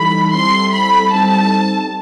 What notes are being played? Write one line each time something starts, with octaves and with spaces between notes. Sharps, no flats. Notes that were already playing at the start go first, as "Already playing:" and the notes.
Already playing: E3 G3 D#4 A4 B5
G3 C4 E4 A4 C6
B5
G3 C4 D#4 A4 A5